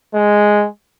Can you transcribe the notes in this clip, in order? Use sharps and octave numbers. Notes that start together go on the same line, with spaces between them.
G#3